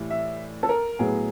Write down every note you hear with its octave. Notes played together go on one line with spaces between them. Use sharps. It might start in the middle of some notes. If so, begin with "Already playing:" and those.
Already playing: A2 E3 G3
E5
A4
A#4
A2 F#3 B3 G#4